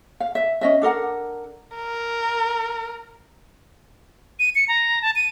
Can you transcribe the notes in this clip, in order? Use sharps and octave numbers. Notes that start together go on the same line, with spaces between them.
F5
E5
C#4 D#5 E5
D4 A4 A#4 F#5
A#4
D#7
C#7
A#5
A5
D#7